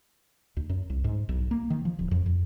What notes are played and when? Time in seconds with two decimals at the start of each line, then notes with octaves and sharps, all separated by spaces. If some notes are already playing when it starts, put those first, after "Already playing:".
0.57 D2
0.70 F#2
0.90 C2
1.04 G#2
1.29 B1
1.51 A#3
1.70 D#3
1.85 F3
1.99 D1
2.11 F2
2.26 F2